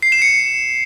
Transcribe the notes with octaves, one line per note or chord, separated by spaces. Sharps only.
C7
E7
C#7